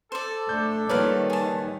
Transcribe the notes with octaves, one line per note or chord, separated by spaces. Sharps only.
A4 C5 D5
A3 D4 G6
D#3 G3 A#3 F4 A#4 B4 C#5 D5
G#4 A5